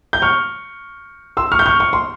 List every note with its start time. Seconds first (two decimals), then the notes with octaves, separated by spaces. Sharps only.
0.13 G6
0.22 C#6 F6
1.37 C6 E6
1.52 C#6 F6
1.59 G6
1.66 C#6 F6
1.80 C#6
1.93 C6